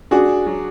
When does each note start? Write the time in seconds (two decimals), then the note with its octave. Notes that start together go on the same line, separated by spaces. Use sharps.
0.11 D4 F#4 G#4
0.46 F#3